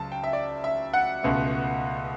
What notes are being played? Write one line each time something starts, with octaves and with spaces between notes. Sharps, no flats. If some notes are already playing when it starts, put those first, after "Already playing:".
Already playing: C#2 C#3 F#3 A5
G5
E5
D5
E5
F#5
C#2 B2 A3